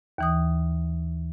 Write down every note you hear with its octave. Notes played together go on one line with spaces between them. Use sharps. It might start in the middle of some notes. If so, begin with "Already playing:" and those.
D#2 E3 D#6